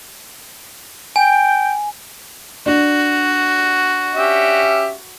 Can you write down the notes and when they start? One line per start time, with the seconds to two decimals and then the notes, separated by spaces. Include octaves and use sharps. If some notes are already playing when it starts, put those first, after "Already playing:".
1.16 G5 G#5
2.66 D4 F#4
4.15 C#4 G4 E5